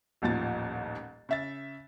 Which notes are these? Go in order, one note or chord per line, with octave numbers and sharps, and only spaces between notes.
D#1 A1 D#2 F3 A6
C#3 E5 A6